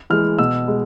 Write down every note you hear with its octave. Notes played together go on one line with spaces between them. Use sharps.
E3 G#3 F6
B2 E6
G#3